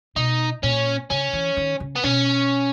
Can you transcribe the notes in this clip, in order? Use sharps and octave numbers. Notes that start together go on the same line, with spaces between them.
B2 D#4
A#2 C#4
C#3 C#4
E3
D#3
C#3
B3
B2 C#4